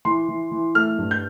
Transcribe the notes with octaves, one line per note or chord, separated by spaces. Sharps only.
E3 C6
E3
E3
A3 F6
G2
G6